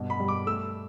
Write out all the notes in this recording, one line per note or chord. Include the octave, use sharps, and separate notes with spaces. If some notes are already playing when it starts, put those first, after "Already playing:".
Already playing: G2 B2
B5
G3
D6
A3 E6